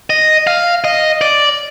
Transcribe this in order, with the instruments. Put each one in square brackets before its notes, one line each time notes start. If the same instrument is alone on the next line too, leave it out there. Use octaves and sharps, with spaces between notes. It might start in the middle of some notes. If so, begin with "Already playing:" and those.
[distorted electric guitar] D#5
F5
D#5
D5